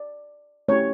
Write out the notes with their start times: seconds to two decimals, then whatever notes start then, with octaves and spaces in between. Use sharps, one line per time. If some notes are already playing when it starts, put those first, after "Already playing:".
Already playing: D5
0.68 A3 C#4 E4 G4 C#5